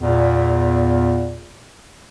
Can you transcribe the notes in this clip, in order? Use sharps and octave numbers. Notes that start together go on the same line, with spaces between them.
E2 A#2